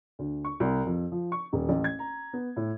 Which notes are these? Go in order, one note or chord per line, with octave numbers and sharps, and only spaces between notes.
D2
C#6
C2
F2
F3
C#6
D#1
A1
G#6
A#5
B3
A2